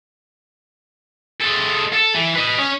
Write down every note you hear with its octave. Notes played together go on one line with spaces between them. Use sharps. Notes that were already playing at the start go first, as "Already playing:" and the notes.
G#3 A4
A4
E3
B4 D#5
C#4